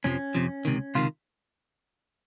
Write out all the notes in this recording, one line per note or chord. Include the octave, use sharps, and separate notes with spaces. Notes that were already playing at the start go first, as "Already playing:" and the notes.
F2 C3 F3 C#4
F2 C3 F3
C#2 C3 D#3
C#2 C3 D#3 F4